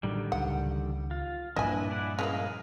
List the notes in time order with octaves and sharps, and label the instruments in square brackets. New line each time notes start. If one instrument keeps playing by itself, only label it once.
[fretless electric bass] A2 F#3 [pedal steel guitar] D3 D#3 G3
[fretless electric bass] C#2 [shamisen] F#5
[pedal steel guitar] F4
[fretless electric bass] G2 A#2 F3 [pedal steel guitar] D4 E4 B4 [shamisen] D#5 G#5
[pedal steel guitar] E4 D5 F#5
[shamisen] C#3 E3 A#3 [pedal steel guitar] G#3 D#5 F5